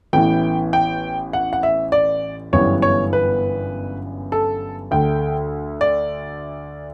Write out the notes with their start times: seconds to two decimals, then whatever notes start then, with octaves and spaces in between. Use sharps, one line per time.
0.13 A1 A2 E3 B3 G5
0.73 G5
1.33 F#5
1.53 F#5
1.63 E5
1.92 D5
2.53 G1 F#2 E3 G3 B3 C#5
2.82 C#5
3.13 B4
4.32 A4
4.91 D2 D3 A3 G5
5.81 D5